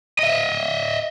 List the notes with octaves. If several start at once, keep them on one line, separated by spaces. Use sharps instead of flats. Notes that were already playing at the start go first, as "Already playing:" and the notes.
D#5 E5